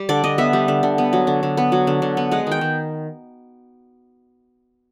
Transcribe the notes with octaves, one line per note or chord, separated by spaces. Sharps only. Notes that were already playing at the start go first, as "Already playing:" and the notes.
Already playing: G3
D3 D5
D3 D#5
B3 E5
G3
D3
D3
B3
F#3
D3
D3
B3
F#3
D3
D3
B3
G#3 F#5
D#3 G5
D#3